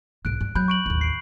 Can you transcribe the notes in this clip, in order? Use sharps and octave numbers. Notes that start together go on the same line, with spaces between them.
C2 G#2 F#6 D7
G2
F#3 B5 F#6 G6
C#6 D7 F#7
A1 D#2
C7 D7